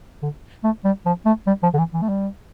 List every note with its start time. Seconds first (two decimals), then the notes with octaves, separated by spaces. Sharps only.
0.22 D3
0.64 A3
0.84 G3
1.06 F3
1.25 A3
1.47 G3
1.63 F3
1.74 D3
1.78 E3
1.93 E3
2.02 A3
2.09 G3